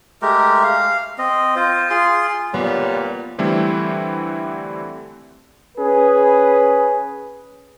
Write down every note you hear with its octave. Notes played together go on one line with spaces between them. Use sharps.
G#3 A3 G4 A#4
F5
C4 D#5
F4 C5
F4 G#4 C6
A#2 G3 B3 C#5
D3 E3 G3 A3 C4 E4
C#4 G#4 B4